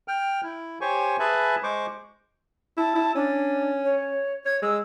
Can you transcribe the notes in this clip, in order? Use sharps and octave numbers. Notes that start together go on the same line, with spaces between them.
G5 F6
E4
G4 C5 C#5 G#5 C#6
G#4 B4 E5 G#5 A5 B5
G#3 C5 C#6 D6
E4 A5
E4
C#4 D4
C#5
C#5 G#6
G#3 E6